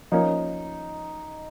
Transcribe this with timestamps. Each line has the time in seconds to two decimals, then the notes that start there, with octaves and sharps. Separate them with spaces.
0.12 F3 A#3 C#4 D#4